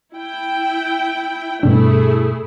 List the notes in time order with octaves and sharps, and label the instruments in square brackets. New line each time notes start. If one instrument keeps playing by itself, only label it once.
[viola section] E4 G5
[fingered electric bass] G2 B2 D4 [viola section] A3 E4 G#4